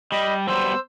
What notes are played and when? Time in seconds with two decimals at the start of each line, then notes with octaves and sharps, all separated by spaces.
0.12 G3 D#5 B5
0.48 F#3 G3 B3 C5 E6